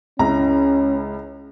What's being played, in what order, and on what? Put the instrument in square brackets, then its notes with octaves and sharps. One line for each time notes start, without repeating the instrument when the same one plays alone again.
[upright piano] C#2 E4 A#5 [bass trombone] C#4